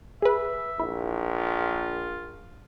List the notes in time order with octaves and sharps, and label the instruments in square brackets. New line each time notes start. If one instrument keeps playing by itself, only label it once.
[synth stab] G#4 B4 [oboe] E5
[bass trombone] A#1 [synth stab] E4
[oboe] F4